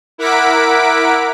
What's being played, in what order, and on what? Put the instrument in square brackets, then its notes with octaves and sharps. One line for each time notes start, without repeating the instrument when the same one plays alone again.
[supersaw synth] E4 A#4 F#5 D6 B6 D7